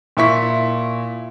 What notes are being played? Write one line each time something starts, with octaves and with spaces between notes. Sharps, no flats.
A#2 E4 C#6 B6